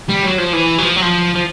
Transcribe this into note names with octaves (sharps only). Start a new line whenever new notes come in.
G3
F#3
F3
E3
F#3
F3
F#3
F3
F3